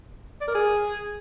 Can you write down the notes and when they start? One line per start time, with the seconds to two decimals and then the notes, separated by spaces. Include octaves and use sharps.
0.41 D5
0.48 A#4
0.55 G#4